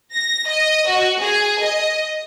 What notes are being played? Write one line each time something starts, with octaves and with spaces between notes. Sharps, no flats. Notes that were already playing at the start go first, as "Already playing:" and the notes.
A#6
D#5
F#4
G#4
D#5